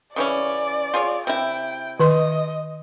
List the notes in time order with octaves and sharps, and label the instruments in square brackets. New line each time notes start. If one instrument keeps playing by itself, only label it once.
[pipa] C#3 E3 C#4 [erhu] D5
[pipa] F4 G#4 C#5
[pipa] C3 E4 [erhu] G5
[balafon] D#3 B4 C6 [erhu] D#5